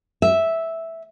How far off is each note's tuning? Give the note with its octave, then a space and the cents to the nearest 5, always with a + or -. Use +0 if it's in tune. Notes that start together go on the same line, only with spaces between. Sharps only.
E5 -5